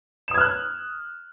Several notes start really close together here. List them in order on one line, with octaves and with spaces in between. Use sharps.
E7 D#6 G#6 F6 F#6